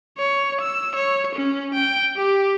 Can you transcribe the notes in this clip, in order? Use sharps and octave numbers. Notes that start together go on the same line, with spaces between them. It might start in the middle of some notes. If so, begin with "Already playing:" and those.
C#5
E6
C#5
C#4
G5
G4